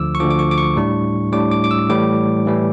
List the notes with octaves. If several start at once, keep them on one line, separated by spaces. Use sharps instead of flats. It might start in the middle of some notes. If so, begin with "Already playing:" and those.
Already playing: D2 D3 F3 D6 E6
C#6
D2 D3 F3 D6
D6
C#6
D6
C#6
A2 G3 D4
A2 G3 D4 D6
D6
D6
E6
A2 E3 G3 D6
A2 E3 G3